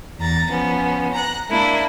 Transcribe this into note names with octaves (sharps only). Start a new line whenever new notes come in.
E2 A#5 A6
F3 B3 C#4
A#5 F#6
G#3 A#3 D4 E4